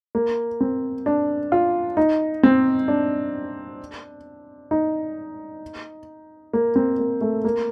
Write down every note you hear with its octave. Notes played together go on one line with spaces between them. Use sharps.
A#3
C4
D4
F4
D#4
C4
D4
D#4
A#3
C4
A#3
A3
A#3